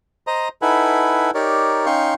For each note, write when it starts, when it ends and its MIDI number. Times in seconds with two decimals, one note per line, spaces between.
0.27 0.48 72
0.27 0.48 75
0.27 0.48 82
0.62 1.31 63
0.62 1.31 64
0.62 1.31 69
0.62 1.31 71
0.62 1.31 78
0.62 1.31 80
1.35 1.86 63
1.35 1.86 67
1.35 1.86 70
1.35 1.86 73
1.35 1.86 74
1.86 2.14 61
1.86 2.14 63
1.86 2.14 77
1.86 2.14 79
1.86 2.14 84
1.86 2.14 85